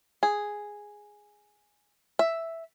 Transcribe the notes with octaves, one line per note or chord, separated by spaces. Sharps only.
G#4
E5